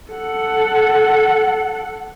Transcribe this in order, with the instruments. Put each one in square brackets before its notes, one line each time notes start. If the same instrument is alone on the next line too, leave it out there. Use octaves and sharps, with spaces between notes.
[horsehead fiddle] A4 F#5